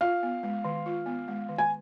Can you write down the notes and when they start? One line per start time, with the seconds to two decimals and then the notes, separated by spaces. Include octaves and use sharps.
0.01 F4 F5
0.23 B3
0.43 G#3
0.65 D#3
0.86 F4
1.06 B3
1.28 G#3
1.49 D#3
1.58 G#5